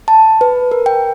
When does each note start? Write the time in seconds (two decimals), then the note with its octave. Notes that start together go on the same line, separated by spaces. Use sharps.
0.08 A5
0.41 B4
0.72 A#4
0.86 G5